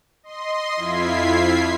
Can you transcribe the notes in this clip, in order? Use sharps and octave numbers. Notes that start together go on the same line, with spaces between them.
D#5 C6
F2 E4 F4 G#6 B6 C7